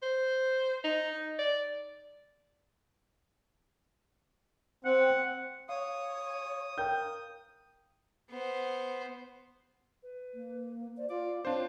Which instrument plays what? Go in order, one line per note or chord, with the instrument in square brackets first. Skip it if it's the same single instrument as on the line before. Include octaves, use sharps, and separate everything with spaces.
[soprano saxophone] C5
D#4
D5
[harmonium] C4 [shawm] F#5
[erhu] C#5 [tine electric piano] F5 [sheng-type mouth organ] D#6
[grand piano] A#4 G5 G6
[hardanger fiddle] B3 C5
[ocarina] B4
[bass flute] A#3
[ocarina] C5 [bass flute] D5
[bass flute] F4 [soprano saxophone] D5 [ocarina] F5
[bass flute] C4 [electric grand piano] D4 C5 [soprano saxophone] F4 [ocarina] C#5